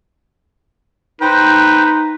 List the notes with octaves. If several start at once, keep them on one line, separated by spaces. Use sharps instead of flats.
D#4 B4 C5 G5